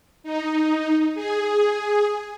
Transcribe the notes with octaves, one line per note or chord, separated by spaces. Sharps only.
D#4
G#4